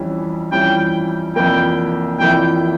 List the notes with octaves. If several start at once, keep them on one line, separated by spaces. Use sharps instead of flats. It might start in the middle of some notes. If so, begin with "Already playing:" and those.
Already playing: F2 E3 G3 C#4
F2 E3 G3 C#4 G5
F1 F2 E3 A#3 E4 G5
F1 F2 E3 A#3 E4 G5